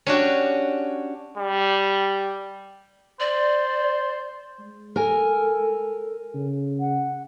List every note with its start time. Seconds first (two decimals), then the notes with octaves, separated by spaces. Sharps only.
0.06 C#4 D4 F#4 G4
1.37 G3
3.20 C5 D5
4.60 G#3
4.96 A4 A#4 G#5
6.35 C#3
6.80 F#5